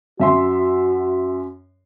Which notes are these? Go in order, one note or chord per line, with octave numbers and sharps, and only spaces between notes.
F#2 F#4 E5 C6